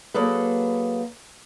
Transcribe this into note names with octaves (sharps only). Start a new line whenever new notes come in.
F#3 A#3 G#4 A4 B4